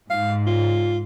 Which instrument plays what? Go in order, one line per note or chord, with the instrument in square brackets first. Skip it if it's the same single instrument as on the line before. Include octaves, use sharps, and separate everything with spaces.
[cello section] G#2 [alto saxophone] F5
[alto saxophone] F4